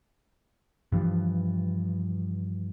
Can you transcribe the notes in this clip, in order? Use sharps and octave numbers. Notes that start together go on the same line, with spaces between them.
G2 E3 F3